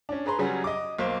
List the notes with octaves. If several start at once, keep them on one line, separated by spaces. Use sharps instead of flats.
C#4 D4
G#4 B4 A#5 C6
C#3 F#3 G3 C#4 F#4 G#4
D#5 D6
B1 A#3 C5